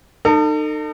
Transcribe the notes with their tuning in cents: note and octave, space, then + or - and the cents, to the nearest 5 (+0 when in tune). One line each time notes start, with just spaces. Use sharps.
D#4 -30 A4 +35